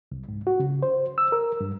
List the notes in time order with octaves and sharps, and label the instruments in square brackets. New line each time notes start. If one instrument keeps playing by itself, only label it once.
[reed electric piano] C2
G#2
F#4
C#3
C5
E6
A#4
G2